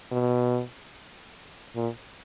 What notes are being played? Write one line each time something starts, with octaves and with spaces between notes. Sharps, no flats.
B2
A#2